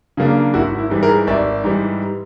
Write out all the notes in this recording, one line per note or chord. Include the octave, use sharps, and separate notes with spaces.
C#3 F#3 A#3 D4
G#1 E4 F#4
E4
G#2 E3 G3
G#4 A#4
G#1 D5 E5
G#2 E3 G3